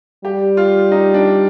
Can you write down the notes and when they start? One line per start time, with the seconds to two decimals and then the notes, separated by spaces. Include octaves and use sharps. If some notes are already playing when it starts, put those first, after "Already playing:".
0.24 G3 G4
0.57 F4
0.92 D#4
1.14 D4